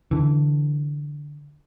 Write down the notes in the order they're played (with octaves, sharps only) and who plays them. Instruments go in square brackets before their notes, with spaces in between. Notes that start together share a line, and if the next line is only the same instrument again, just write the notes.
[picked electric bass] D3 E3